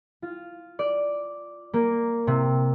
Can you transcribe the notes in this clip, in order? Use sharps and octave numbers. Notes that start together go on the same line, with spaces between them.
F4
D5
A#3
C3